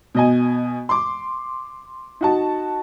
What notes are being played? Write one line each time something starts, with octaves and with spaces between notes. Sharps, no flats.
B2 D#5 G#5
C6 D6
D#4 F#4 A5